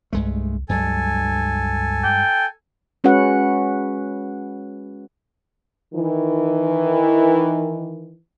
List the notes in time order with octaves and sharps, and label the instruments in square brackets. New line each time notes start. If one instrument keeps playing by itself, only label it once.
[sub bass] C2 [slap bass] G2 G#3 A3
[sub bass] C#2 [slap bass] G2 F#3 G#3 [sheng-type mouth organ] A4 G#5
[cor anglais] G5
[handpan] G#3 C#4 F#4 B4 F#5
[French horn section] D#3 E3